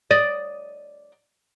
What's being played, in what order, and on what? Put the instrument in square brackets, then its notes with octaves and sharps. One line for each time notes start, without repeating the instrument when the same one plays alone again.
[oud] D5 D#5